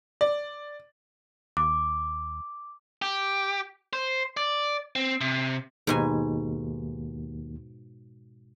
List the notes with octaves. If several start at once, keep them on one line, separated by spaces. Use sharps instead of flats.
D5
D#2 D6
G4
C5
D5
C4
C3
D#2 G#2 B2 G#5